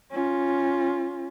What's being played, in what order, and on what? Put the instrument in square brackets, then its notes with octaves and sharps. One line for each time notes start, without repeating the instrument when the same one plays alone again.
[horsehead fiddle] C#4 F4